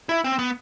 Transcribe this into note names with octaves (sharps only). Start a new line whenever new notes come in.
E4
C4
B3